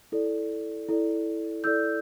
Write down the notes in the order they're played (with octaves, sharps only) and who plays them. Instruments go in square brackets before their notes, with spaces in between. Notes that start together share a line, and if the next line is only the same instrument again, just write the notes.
[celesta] E4 A4 D5
E4 A4 D5
E4 A4 D5 E6 G6